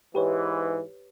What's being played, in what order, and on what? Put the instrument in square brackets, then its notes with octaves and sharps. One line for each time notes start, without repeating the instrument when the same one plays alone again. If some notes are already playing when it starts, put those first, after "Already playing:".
[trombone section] G#2 E3 [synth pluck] G4 B4 C#5